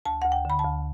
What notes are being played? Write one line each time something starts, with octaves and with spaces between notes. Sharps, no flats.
D2 A5
D2 F#5
G5
D3 B5
A5
D2